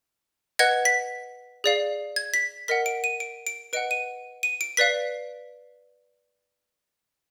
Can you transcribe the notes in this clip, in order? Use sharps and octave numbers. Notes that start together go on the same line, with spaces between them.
B4 D#5 F#5 G#6
B6
G#4 D5 F5
G#6
B6
A#4 D#5 F#5 B6
D7
D#7
D7
D7
B4 D#5 F#5 D7
D#7
D#7
D7
B4 D5 F5 B6